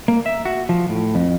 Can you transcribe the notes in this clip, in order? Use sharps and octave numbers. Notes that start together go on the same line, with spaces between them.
A#3
E5
F#4
F3
A2
F2